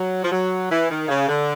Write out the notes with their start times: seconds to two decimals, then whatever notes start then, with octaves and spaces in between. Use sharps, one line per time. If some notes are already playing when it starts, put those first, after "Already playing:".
Already playing: F#3
0.23 F3
0.31 F#3
0.70 E3
0.89 D#3
1.08 C#3
1.28 D3